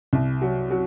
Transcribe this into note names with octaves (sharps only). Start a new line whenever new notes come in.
C2
F#3
F#3